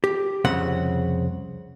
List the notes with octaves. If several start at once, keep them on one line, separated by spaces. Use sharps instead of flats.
G4
C2 F2 C#3 C4 F#5